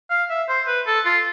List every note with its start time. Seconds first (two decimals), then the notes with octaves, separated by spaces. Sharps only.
0.10 F5
0.30 E5
0.49 C5
0.67 B4
0.87 A4
1.05 F4